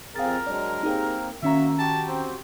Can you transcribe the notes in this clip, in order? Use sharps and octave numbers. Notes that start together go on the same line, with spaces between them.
F2 C4 G#4 A#4 F5 A6
F#3 G#3 D4 D5
A#3 C4 D#4 G4 G#4
D#3 A#3 C#4 F#4 E5 A#5
F#4 G4 G5 A5
C4